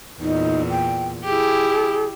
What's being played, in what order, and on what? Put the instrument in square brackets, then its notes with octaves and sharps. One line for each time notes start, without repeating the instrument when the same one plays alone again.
[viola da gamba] E2 A#2 [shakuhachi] D#4
[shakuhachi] G5
[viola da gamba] E4 G4 [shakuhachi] G#4